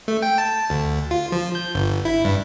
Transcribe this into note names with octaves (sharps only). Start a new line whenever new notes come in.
A3
G5
A5
D2
F4
F3
G6
G1
E4
G2